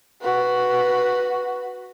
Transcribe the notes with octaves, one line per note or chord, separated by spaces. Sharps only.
F#4 B4